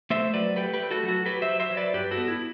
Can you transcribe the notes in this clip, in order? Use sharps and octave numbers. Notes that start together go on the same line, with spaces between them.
A3 C5 E5
F#3 B4 D5
A3 G4 B4
G4 B4
A3
F#4 A4
F#3
F#4 A4
F#3 G4 B4
C5 E5
F#3
C5 E5
F#3
B4 D5
G2 G4 B4
F#4 A4
B3
E4